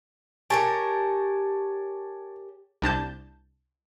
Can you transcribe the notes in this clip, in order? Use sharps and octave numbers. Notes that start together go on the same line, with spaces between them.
G4 A#4 C#5 G#5 A5 C#6
C2 D4 A5 G6